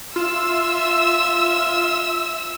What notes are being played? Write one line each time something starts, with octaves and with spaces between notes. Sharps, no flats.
F4 E5 E6